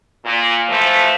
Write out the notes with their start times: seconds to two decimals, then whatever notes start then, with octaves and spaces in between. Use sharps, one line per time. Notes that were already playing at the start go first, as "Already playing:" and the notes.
0.25 A#2
0.69 E3 F3 A3